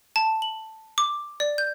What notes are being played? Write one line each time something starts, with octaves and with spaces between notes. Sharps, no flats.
A5
F#7
D6
D5
G6